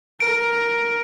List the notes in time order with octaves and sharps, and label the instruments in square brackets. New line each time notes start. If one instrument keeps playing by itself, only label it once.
[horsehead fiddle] A#4 [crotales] D7